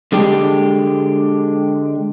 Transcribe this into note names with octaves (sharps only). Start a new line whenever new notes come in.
D3 G#3 D4 G4